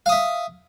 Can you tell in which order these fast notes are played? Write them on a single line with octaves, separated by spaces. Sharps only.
F5 D#6 E5